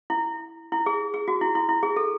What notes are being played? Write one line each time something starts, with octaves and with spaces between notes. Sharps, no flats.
E4
E4
G#4
G#4
F#4
E4
E4
E4
G#4
A4